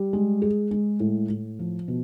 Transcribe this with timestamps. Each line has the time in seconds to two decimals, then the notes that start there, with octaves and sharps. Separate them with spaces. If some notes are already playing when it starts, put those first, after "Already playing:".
Already playing: G3
0.13 G#3
0.42 G#4
0.71 G#3
1.00 A2
1.30 A2
1.59 F3
1.88 B2